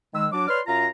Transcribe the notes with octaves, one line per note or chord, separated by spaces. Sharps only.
D#3 G#3 E6
F#3 D4 D6
B4 C#5 D5 C6 F6
F#2 F4 F5 A#5